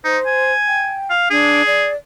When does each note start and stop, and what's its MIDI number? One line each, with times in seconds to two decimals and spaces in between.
0.04 0.18 63
0.04 0.53 72
0.26 0.98 80
0.67 1.09 79
1.10 1.27 77
1.30 1.62 62
1.30 1.88 68
1.67 1.95 74